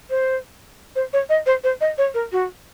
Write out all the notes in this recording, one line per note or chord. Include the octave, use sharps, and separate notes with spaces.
C5
C5
C#5
D#5
C5
C5
D#5
C#5
A#4
F#4